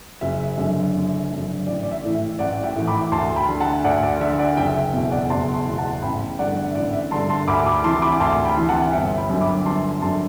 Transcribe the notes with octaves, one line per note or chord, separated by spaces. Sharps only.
F#1 E5
F#2 D3
F#1
F#2 D3
A1 D5
D5
E5
A2 E3
E5
A1 D5 F#5
E5 G5
A2 E3
B5 D6
D2 A5 C6
G5 B5
D3
F#5 A5
D2 D5 F#5
D5
D3 E5
D5 F#5
F#1 E5 G5
E5
E2 B2 E5
D5 F#5
F#1 A5 C6
A5 C6
E2 B2
F#5 A5
A1 G5 B5
G2 D3 D5 F#5
D5
E5
A1 D5
E5
G2 D3 A5 C6
A5 C6
D2 B5 D6
B5 D6
C3 E3 A5 C6
B5 D6
D2 A5 C6
G5 B5
C3 E3
F#5 A5
G1 E5 G5
G5 B5
F#2 D3
B5 D6
G1 A5 C6
F#2 D3 A5 C6